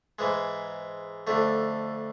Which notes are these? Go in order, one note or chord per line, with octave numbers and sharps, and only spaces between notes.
G#2 E3 G#3
F2 D3 A3